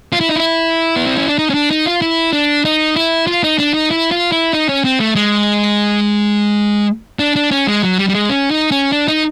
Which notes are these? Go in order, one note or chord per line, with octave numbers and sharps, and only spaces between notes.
F4
E4
D#4
E4
B3
C4
C#4
D4
D#4
C#4
D4
D#4
F4
E4
D4
D#4
E4
F4
D#4
D4
D#4
E4
F4
E4
D#4
C#4
C4
A3
G#3
D4
D4
C#4
G#3
F#3
G3
G3
G#3
C#4
D#4
C#4
D4
D#4